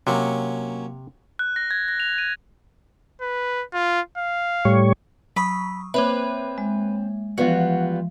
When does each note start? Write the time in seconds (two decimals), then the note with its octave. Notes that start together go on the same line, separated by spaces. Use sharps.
0.07 C3 F#3 A#3 C#4
1.39 F#6
1.56 A#6
1.71 G#6
1.88 A#6
2.00 F7
2.18 D#7
3.21 B4
3.73 F4
4.18 F5
4.65 A2 G3 C#5
5.36 F#3 B5 C#6 D#6
5.94 A#3 C4 B4 C#5 E5
6.58 G#3
7.38 E3 F3 G3 B3 F4 F#4